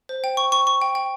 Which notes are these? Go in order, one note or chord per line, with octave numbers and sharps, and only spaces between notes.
C5
G5
C#6
C#6
C#6
G5
G5